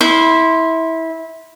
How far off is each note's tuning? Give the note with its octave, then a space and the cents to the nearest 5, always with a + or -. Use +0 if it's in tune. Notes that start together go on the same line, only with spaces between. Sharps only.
E4 -20 C6 +0